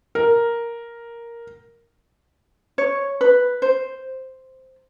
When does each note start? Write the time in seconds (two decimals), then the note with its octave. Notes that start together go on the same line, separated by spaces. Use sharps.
0.15 A#4
2.78 C#5
3.21 B4
3.62 C5